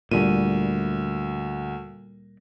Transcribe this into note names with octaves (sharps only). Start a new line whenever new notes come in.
D2 A#2 G3 D#7